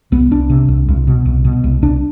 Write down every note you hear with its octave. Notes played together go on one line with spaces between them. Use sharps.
C2 B3
C2 D4
C3
C2
C2
B2
C2
B2
C2
C2 D4